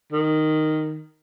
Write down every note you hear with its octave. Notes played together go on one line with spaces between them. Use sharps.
D#3